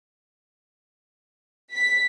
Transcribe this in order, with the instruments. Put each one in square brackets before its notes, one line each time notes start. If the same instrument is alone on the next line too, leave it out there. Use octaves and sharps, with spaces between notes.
[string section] B6